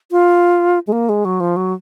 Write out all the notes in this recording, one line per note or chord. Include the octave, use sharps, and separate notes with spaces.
F4
G#3
A#3
G#3
F#3
F3
F#3